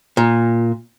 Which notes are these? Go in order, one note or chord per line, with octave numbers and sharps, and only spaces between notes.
A#2